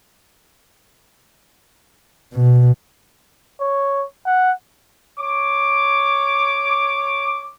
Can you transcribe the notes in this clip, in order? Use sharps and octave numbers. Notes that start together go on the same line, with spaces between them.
B2
C#5
F#5
C#5 D6